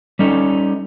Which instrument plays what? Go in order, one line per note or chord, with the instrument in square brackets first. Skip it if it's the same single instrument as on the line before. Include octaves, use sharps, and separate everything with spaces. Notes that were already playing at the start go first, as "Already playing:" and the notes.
[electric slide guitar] G3 C#4 D#4 A4